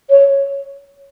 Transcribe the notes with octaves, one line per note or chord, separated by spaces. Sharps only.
C#5